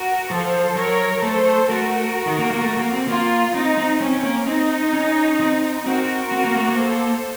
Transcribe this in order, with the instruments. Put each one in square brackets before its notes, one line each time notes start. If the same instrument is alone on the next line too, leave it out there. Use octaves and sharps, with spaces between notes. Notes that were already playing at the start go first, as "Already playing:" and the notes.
Already playing: [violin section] F#4 A#4
[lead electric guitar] F3 [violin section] A4 C5
[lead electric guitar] F#3 [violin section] A#4 C#5
[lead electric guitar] A3 [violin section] A4 C5
[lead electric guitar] A3 [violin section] F#4 A#4
[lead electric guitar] D#3
A#3
A#3
A3
A#3
C4
[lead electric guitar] A#3 [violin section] F4
[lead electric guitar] C4 [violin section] D#4
[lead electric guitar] C4
[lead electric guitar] C4 [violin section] C#4
[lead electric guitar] C4
A#3
[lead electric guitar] C4 [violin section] D#4
[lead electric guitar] C#4
C4
[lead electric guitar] C4 [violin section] F#4 A#4
[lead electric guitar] C4
A#3
A3
A#3
[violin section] A4 C5